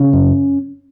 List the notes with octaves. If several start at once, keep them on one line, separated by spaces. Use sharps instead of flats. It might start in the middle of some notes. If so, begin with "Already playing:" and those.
Already playing: C#3 C#4
F#2